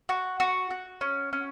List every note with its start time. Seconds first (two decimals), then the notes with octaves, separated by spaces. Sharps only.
0.09 F#4
0.40 F#4
0.70 F#4
1.01 C#4
1.33 C#4